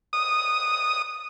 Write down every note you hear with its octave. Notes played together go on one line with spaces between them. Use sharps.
D#6